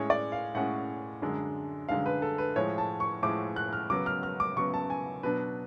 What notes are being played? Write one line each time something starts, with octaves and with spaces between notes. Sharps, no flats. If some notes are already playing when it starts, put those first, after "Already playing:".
Already playing: A2 G#3 C#4 C#5
D5
F5
A2 G#3 C#4 F#5
F#2 D3 G#3 D4
F#2 D3 G#3 D4 F5
B4
A4
B4
A2 F3 G#3 C#5
A5
C#6
A2 F3 G#3 D6
F#6
F6
C#3 F#3 B3 D6
F6
F6
D6
C#3 F#3 B3 C#6
A5
G#5
B2 F#3 B3 D4 B4